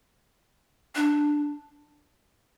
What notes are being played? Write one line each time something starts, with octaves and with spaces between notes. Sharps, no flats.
D4